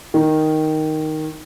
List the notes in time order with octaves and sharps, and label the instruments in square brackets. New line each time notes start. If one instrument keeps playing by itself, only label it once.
[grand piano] D#3